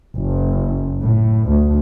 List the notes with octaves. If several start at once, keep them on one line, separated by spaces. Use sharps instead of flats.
F#1
A2
D2